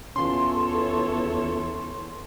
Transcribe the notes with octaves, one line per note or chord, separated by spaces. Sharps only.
E2 C#4 F4 A4 C#5 C6